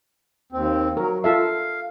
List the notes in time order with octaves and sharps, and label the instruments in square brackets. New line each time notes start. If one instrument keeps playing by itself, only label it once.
[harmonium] D#2 C4
[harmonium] F#3 [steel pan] A#4
[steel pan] F4 A4 E5 [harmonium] F5